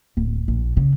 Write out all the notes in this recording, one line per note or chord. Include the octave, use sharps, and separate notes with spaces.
D1
A#1
C#3